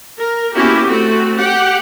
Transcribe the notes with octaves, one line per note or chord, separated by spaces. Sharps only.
A#4
A#3 B3 C#4 E4 F#4 G4
A3 C4 F#4
G4 F#5 G5